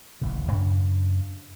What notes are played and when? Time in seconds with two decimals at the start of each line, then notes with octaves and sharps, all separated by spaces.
0.21 D1 A1 D#2 C#3
0.51 F#2 C#3 D4